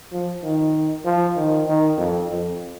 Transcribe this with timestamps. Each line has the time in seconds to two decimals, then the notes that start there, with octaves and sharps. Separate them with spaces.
0.12 F3
0.43 D#3
1.05 F3
1.36 D#3
1.66 D#3
1.97 F2
2.29 F2